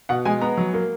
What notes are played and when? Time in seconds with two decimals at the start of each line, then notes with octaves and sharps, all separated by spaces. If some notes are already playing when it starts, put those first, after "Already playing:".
0.09 B2 F#5
0.25 G#3 G#5
0.41 B3 A#5
0.57 F#3
0.74 A#3